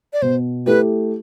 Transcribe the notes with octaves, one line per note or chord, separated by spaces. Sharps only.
D5
B2 C5
A3 E4 G4 B4